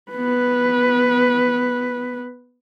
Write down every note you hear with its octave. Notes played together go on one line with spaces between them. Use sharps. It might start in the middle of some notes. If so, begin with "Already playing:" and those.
B3 B4